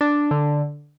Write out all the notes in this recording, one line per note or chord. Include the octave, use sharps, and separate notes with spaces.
D4
D3